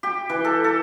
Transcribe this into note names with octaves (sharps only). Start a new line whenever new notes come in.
G4
E3
A4
A4